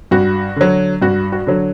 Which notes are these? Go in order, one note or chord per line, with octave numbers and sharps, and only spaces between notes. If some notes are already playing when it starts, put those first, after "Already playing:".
G2 F#4
D3 F#3
G2 F#4
F#4
D3 F#3